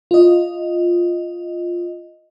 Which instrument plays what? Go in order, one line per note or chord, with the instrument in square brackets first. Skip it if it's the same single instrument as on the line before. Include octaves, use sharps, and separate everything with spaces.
[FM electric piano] F4 D#5